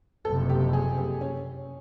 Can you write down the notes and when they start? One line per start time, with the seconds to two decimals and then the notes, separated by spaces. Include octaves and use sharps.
0.25 F#1 F2 C3 A4
0.49 G4
0.73 G#4
0.97 G4
1.21 C#4